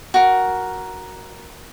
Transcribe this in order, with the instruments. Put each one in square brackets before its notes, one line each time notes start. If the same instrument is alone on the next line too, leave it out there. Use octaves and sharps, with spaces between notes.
[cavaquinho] F#4 A#4